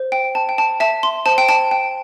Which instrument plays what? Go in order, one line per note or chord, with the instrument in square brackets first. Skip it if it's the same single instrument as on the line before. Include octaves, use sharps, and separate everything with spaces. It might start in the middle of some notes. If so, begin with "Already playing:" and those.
Already playing: [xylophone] C5
G5
G5 A5
G5
A5
E5 A5
C6
C5 A5
G5
A5
G5